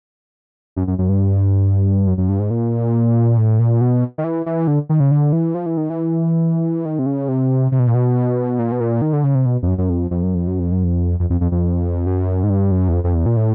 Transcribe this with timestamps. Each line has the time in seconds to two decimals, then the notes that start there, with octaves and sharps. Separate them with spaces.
0.76 F#2
0.87 F#2
0.98 F#2
1.09 G2
2.07 F#2
2.18 F#2
2.29 G2
2.39 G#2
2.51 A#2
3.37 A2
3.59 A#2
3.81 B2
4.18 D#3
4.24 E3
4.46 E3
4.67 D3
4.89 D#3
5.00 C#3
5.11 D3
5.33 E3
5.54 F3
5.66 E3
5.77 D#3
5.90 E3
6.85 D#3
6.99 C3
7.06 C#3
7.28 C3
7.72 C3
7.79 B2
7.87 A#2
7.95 B2
8.59 A#2
8.72 B2
8.80 A#2
9.02 D#3
9.13 D3
9.24 C#3
9.35 C3
9.46 B2
9.63 F2
9.67 F#2
9.78 F#2
9.90 F2
10.11 F2
10.23 F#2
10.34 F2
10.47 F#2
10.60 F2
10.72 F#2
10.84 F2
11.20 F2
11.30 F2
11.41 F2
11.52 F2
12.06 F#2
12.43 G#2
12.50 G2
12.71 F#2
12.89 E2
12.93 F2
13.04 F2
13.14 E2
13.26 A#2
13.37 A2